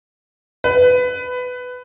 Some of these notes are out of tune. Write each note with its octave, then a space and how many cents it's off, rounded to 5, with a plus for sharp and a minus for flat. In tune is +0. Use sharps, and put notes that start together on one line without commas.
B4 +15